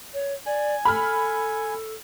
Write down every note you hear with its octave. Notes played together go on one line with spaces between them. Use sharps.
C#5
D5 G#5
A4 B5 F6